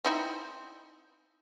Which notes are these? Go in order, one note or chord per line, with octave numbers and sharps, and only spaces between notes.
C4 D#4 E4